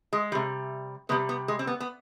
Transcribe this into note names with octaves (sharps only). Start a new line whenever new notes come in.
G#3
C3 G3
C3 G3 B3
B3
G#3
C4
B3
B3